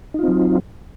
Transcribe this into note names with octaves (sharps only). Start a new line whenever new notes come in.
F#3 C4 D#4 F4